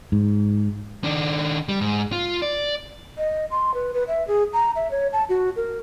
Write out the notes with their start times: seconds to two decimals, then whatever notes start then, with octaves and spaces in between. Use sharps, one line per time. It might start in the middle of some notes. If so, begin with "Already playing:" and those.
0.12 G#2
1.04 D#3 D4
1.68 G3
1.81 G#2
2.12 F4
2.42 D5
3.18 D#5
3.51 C6
3.74 B4
3.94 B4
4.08 E5
4.28 G#4
4.53 A#5
4.76 E5
4.91 C#5
5.13 A5
5.29 F#4
5.56 A#4